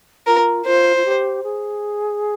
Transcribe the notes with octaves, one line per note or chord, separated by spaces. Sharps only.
F4 A#4
F4 C5
F4
G4
G#4